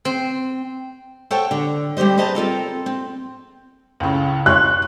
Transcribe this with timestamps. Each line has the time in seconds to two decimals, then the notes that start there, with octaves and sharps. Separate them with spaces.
0.05 C4
1.31 A4 C5 C#5 F#5 G5 A5
1.51 D3
1.97 G3 C4 G4 C5 D#5
2.18 G#4 B4 C5 D#5 A5 A#5
2.35 C4 F4 A4 A#4
2.86 C4
4.00 C#2 A2 C#3
4.46 C#5 C6 C#6 F#6